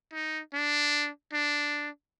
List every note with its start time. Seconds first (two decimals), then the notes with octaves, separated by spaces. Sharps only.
0.13 D#4
0.54 D4
1.33 D4